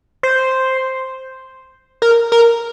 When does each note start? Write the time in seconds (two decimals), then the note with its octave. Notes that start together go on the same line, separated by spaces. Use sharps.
0.23 C5
2.02 A#4
2.32 A#4